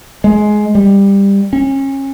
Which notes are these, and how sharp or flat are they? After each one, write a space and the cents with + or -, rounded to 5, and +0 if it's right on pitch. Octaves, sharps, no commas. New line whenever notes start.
G#3 +15
G3 +15
C#4 -30